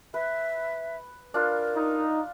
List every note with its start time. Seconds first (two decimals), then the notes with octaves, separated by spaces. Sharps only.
0.14 B4 E5
1.34 D4 F4 A#4
1.75 D#4